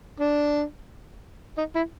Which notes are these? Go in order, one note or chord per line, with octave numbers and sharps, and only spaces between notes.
D4
D#4
E4